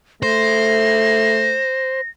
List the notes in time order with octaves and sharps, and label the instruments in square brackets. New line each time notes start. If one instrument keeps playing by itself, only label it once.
[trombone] A3 [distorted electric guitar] C5 [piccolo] A#6